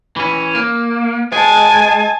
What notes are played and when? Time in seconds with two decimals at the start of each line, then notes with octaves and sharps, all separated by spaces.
0.16 E3 C#4
0.55 A#3
1.32 G#3 G#5 A5